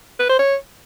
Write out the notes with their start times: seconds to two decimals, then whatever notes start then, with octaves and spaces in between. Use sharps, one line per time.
0.19 B4
0.29 C5
0.39 C#5